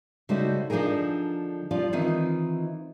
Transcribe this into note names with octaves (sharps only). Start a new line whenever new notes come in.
C#3 G3 A3 D#4 F#4 C5
D3 F3 D4 D#4 G#4 A#4
F3 G3 F4 D5 F5
D#3 E3 C4 D#4 F4